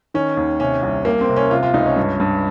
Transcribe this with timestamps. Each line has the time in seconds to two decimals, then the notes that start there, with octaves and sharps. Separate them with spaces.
0.14 D#3 C#4
0.37 D#2
0.60 C3 C#4
0.83 C2
1.05 C2 A#3
1.21 C4
1.29 C3
1.36 C#4
1.51 C3 F4
1.63 F4
1.74 C#2 D#4
1.86 C#4
1.97 G2
2.20 G2